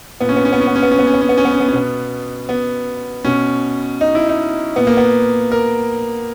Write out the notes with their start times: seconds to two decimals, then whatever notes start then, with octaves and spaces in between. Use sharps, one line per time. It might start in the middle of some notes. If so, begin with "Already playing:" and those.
0.20 A#2 B3
0.29 C#4
0.36 B3
0.45 C#4
0.53 B3
0.60 C#4
0.68 B3
0.76 C#4
0.83 B3
0.91 C#4
0.99 B3
1.07 C#4
1.14 B3
1.21 C#4
1.29 B3
1.38 C#4
1.45 B3
1.53 C#4
1.60 B3
1.68 C#4
1.73 B2 B3
2.49 B3
3.24 B2 C#4
4.01 D#4
4.15 E4
4.29 D#4
4.76 A#2 B3
4.87 A#3
4.97 B3
5.52 A#4